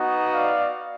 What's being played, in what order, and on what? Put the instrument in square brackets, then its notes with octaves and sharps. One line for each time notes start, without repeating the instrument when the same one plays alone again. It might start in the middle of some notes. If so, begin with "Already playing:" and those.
Already playing: [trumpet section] B3 D#4 F#4
D5 F5